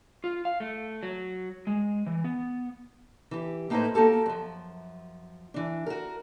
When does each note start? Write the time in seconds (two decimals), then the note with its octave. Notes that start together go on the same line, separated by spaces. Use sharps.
0.24 F4
0.45 F5
0.60 A3
1.03 F#3
1.67 G#3
2.06 E3
2.24 B3
3.31 E3 G4
3.70 A2 A#3 D#4 F#4 B4 C5
3.94 A#3 F#4 G4 A4 A#4
4.26 F#2 F3
5.54 E3 D4
5.86 F#4 A#4